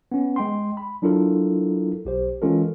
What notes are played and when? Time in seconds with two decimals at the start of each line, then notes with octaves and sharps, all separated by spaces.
0.12 B3 C#4
0.36 G#3 G5 C6
0.77 B5
1.02 F#3 D4 E4 F4 A4 A#4
2.05 B1 G4 C5
2.42 E3 G#3 C#4 F4 A4 A#4